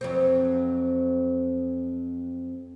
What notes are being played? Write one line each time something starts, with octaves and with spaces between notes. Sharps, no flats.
F2 F#3 C4